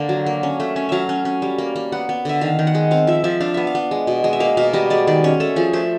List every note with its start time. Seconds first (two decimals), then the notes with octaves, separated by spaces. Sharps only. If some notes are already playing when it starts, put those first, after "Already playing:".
Already playing: D3 A#3
0.09 F#3
0.26 A#3
0.43 C#4
0.60 A3
0.76 C#4
0.89 F#3 E5 F5
1.09 C#4
1.25 C#4
1.42 G3
1.58 A#3
1.76 A#3
1.92 B3 F#5
2.09 B3
2.25 D3 E5
2.41 D#3 F5
2.59 D#3
2.67 F#5
2.75 G#3
2.91 C4 F5
3.07 F3 E5
3.24 F3 E5
3.40 D4 F5
3.54 B3 E5
3.67 F5
3.75 B3
3.91 G#3
4.07 B2
4.24 G#3
4.33 E5
4.40 A#3 F5
4.57 B2 F5
4.73 G3 D#5
4.90 G#3 D5
5.07 D#3 D5
5.24 C#4 C#5
5.40 A3 A4
5.56 F3 G#4
5.73 A3 C5